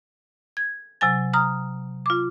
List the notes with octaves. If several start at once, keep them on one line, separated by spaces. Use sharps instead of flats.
G#6
C3 F#3 G#5 A6
A#5 D#6 F6
F4 D6